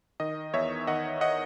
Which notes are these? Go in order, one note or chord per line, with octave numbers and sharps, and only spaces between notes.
D#3 D#5
E2 C#5 E5
D#3 D#5 F#5
D#5 F#5